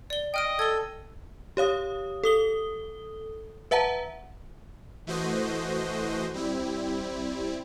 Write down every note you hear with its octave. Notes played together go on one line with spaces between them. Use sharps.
D5 G7
D#5 G5 F6 D7
A4 G#6 G7
G4 C#5 F5 D#6
A4 D#6 G7
B4 E5 F#5 A5 A#5
E3 A3 F#4 C5 D#5
G3 C4 E4